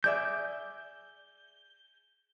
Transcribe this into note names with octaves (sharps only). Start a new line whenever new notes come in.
G#4 D5 E5 G6